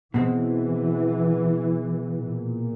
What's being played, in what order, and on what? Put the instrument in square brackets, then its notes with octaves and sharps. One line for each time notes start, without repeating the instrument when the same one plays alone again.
[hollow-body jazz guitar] B2 G#3 C4 [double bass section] E3
[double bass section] A#2